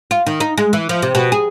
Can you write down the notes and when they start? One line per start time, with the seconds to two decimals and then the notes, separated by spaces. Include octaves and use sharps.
0.11 F4
0.27 D#3
0.40 D#4
0.58 G#3
0.73 E3
0.89 F3
1.02 C3
1.15 B2
1.32 G#4